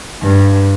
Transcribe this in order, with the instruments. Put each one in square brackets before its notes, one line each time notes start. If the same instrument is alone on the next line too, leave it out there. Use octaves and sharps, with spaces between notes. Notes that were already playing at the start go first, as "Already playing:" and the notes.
[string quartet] G2